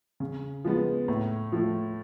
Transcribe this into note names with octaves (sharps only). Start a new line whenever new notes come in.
C#3
F3 G#3 B3
A2
F3 A3